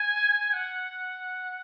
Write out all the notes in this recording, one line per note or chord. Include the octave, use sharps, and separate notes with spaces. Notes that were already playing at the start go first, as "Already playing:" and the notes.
Already playing: G#5
F#5